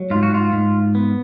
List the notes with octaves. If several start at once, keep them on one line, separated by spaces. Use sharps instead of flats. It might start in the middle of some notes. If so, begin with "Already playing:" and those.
Already playing: F#3
G#2 F4
F#4
F4
G#2
B3